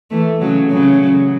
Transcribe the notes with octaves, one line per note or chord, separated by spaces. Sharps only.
E3 A3
C#3 F#3
C#3 F#3